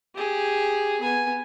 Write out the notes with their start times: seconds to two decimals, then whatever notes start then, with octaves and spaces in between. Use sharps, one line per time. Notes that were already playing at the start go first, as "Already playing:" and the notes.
0.15 G4 G#4
1.00 B3 G#5